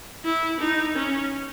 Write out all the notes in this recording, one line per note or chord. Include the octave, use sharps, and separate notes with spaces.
E4
D#4
C#4